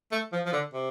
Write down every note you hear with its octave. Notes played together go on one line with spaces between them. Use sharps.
A3
F3
F3
D3
C3